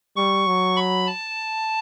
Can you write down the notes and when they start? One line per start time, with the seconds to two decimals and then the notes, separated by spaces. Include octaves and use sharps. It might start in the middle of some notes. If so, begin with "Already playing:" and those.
0.16 G3 C#6
0.47 F#3
0.76 B5
1.06 A5